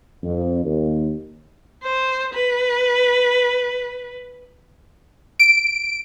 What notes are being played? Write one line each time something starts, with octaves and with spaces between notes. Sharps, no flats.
F2
D#2
C5
B4
D7